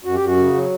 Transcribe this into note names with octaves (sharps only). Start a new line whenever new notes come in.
F#2 F#4
G4
F#2
F#4
C#3
F#3